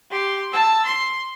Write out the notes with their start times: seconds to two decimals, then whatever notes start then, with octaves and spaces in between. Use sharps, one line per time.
0.11 G4 C6
0.52 A5 E6
0.85 C6